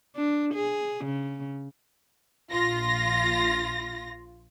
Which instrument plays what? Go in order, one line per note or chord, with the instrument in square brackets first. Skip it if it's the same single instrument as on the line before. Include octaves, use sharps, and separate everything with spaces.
[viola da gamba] D4
G#4
C#3
[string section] A#1 F4 A#6